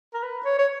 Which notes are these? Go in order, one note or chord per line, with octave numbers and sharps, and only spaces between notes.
A#4
B4
C#5
C#5